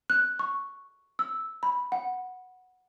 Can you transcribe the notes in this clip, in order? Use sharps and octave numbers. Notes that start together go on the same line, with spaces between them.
F#6
C#6
E6
B5
F#5